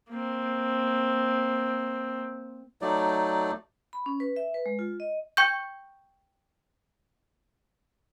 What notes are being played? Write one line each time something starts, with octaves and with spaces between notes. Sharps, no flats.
A#3 C4
F#3 A3 D#4 D5
B5
C#4
B4
E5
B4
G#3
F4
D#5
G5 C#6 G6